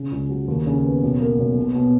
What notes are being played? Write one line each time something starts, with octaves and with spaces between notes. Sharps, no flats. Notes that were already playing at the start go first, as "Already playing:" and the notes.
Already playing: C#3
C#2
F#3
D#2
C#3
B3
B1
A#3
B1
B2
B2